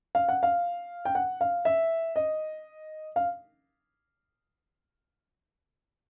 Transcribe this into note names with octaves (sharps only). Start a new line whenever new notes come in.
F5
F#5
F5
G5
F#5
F5
E5
D#5
F5